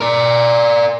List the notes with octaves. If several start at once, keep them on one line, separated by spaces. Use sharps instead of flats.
A#4 D5